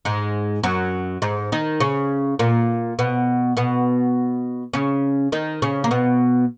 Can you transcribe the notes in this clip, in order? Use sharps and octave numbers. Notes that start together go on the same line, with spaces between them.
G#2 G#3
F#2 F#3
G#2 G#3
D#3 D#4
C#3 C#4
A#2 A#3
B2 B3
B2 B3
C#3 C#4
D#3 D#4
C#3 C#4
A#3
B2 B3